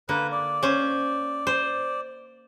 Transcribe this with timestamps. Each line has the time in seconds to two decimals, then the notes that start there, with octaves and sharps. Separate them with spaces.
0.09 D3 A#3 B4
0.32 D5
0.63 C#4 C5
1.47 C5